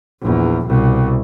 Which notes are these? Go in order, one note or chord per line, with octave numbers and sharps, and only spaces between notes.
A#1 E2
C2 B2